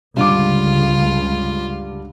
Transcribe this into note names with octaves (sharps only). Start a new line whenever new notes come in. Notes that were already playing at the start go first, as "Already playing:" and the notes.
C#2 G2 D3 F4 D6